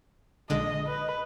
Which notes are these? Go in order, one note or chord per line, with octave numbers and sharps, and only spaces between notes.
A#1 D3 G#3 D#5
B4